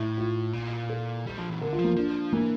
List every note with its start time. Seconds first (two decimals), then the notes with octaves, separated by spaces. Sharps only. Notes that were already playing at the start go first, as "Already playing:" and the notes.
Already playing: A2 E4
0.17 F4
0.53 A#2
0.89 A4
1.27 G3
1.39 F3
1.50 E3
1.61 D3 A#4
1.73 F4
1.79 F3
1.84 A#3
1.96 F3 D4
2.33 E3 A#3